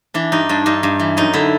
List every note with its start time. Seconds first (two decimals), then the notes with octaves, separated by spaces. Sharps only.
0.14 E3 D4
0.32 G2 D#4
0.49 G2 D4
0.66 G2 D#4
0.83 G2
1.00 E3
1.17 F#2 D#4
1.33 D3 E4